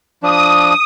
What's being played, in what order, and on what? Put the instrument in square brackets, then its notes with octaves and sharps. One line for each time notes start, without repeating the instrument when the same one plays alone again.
[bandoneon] F3 D4 [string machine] D#6